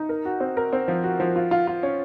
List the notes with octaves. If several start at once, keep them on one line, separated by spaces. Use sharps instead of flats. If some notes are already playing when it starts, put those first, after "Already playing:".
Already playing: D#4
A#4
F#4
C4
A#4
C4
F3
F#4
F3
F4
F4
F4
C#4